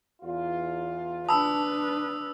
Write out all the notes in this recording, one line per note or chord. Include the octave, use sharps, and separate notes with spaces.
E2 F4
D4 B4 A5 B5 D#6 E6